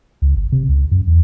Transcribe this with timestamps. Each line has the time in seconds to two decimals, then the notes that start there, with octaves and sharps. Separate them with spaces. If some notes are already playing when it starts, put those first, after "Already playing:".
0.22 C#2
0.36 G1
0.52 C3
0.69 C#2
0.91 F#2
1.07 E2